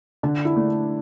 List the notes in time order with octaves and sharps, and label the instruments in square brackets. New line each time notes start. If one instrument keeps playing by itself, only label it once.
[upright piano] D3 [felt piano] D4
[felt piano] E4
[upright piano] A3 D4